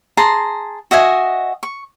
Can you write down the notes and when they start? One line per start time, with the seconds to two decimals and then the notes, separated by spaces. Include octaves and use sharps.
0.17 G#4 A5 A#5 C6
0.91 F#4 D#5 E5 G#5
1.63 C#6